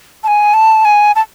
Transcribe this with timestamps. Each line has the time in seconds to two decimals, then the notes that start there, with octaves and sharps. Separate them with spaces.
0.24 A5
0.28 G#5
0.54 A5
0.85 G#5
1.16 A5